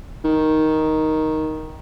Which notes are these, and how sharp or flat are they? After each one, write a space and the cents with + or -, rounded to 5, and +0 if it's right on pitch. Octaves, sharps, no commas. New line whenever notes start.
D#3 +5